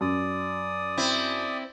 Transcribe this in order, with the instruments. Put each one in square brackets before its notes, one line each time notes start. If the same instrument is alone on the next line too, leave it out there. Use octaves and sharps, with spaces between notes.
[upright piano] F#2 [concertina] D5 D#6
[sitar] C4 E4